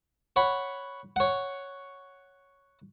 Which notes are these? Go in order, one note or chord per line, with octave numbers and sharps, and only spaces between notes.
C#5 F#5 B5
C#5 F#5